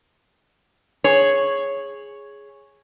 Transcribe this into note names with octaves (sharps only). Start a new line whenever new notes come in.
G#4 C#5